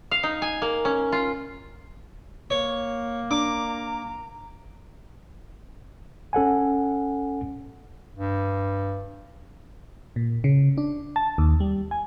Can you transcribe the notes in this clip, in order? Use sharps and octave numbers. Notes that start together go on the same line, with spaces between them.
F5
D#4
G#5
A#3
C#4
F4
A#3 C#5
D4 A#5 D6
C#4 A4 F#5 G#5
G2
A#2
C#3
D4
A5
D#2
G3
G#5